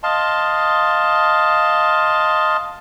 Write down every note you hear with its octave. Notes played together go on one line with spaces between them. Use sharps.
D#5 F5 A5 C6